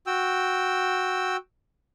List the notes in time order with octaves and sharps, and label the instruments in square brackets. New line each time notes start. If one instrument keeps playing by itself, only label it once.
[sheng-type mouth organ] F#4 G5 E6